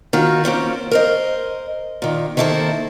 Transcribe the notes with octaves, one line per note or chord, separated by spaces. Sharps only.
D#3 F4 F#4
A#3 C4 C#4 F4
A#4 C5 D#5
A#2 D#3
D#3 A#3 E4 G#4 A4 C5